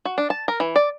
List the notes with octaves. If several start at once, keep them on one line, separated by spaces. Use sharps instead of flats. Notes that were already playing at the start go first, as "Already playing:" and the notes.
F#4
D4
A5
A#4
E3
D5